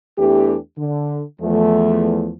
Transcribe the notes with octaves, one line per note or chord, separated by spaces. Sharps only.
E2 E3 A3 D4 G4
D3
E2 F3 A3